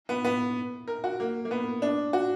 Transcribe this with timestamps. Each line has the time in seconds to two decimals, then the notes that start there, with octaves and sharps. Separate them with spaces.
0.09 B3
0.25 B3
0.88 A#4
1.04 F#4
1.20 A#3
1.45 A#3
1.51 B3
1.82 D4
2.13 F#4